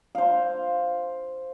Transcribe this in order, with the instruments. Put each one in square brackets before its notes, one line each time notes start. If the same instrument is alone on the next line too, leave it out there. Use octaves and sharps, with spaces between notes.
[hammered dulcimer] C5 F5